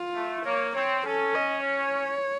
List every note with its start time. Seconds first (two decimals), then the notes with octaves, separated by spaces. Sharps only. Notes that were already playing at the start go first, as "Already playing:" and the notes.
Already playing: F4
0.15 A3
0.45 A#3 C#5
0.75 C4 C#5
1.06 C#4 A4
1.35 D#5
1.66 C#5